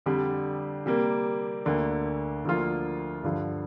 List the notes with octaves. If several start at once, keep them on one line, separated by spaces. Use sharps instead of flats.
F2 D3 G3
C3 G3 A#3
D2 D3 A#3
D2 D3 F3 A#3 F4
G2 D3 F3